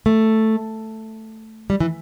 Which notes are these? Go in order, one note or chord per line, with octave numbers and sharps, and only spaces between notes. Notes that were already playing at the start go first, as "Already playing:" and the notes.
A3
G3
E3